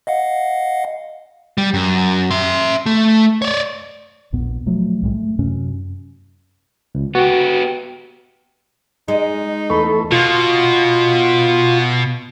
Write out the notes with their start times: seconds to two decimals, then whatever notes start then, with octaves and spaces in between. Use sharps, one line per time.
0.07 D#5 F5 F#5
1.58 G3
1.74 F#2
2.31 E5 C6
2.86 A3
3.42 C#5 D5
4.32 A#1 E2 A#2 B3
4.66 B2 F3 F#3 A3
5.02 C2 A2 G#3
5.14 A3
5.39 F#2 C3 C#4
6.95 C#2
7.15 B3 F#4 G4
9.08 G#3 D#4
9.70 E2 A3 A4 B5 C#6
10.12 B2 F4